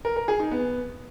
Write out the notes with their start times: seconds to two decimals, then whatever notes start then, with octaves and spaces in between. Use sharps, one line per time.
0.05 A#4
0.16 A#4
0.28 G#4
0.40 D#4
0.51 B3